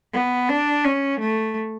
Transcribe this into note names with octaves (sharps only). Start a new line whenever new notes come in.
B3
D4
C#4
A3